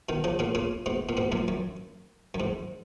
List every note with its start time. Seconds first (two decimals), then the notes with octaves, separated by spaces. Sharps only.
0.09 B2 D#3
0.24 C#3 F3
0.39 A#2 C#3
0.55 A#2 C#3
0.86 G#2 B2
1.09 A#2
1.17 G#2 B2
1.32 F#2 A#2
1.48 F#2
2.34 F#2
2.40 G#2